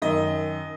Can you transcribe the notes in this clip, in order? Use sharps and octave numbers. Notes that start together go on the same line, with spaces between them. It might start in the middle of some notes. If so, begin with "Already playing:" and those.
F#2 D#3 D#5